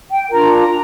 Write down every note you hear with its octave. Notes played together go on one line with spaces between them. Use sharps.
G5
D4 F4 A#4 A#5